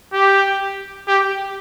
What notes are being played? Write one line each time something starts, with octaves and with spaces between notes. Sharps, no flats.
G4
G4